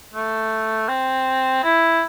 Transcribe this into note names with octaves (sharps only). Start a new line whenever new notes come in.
A3
C4
E4